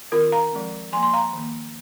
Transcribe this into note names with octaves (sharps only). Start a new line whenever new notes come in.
D#3 C4 F4 A#4
F5 A#5
F3 G#3 C4
F3 A#3 G#5 C6
C6
F5 A#5
D#3 A#3